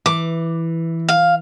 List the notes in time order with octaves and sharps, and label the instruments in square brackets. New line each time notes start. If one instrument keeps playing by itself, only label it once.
[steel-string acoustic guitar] E3 [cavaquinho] D6
[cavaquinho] F5